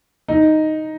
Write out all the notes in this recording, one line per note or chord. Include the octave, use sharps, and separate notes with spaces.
D#4